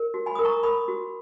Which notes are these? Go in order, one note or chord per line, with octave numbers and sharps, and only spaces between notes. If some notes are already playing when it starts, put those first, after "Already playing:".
Already playing: A#4
F#4
G#5 B5
A#4 D#6
A#5 C#6
A#4 B5 D#6
F#4